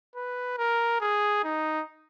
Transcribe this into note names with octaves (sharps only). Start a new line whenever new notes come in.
B4
A#4
G#4
D#4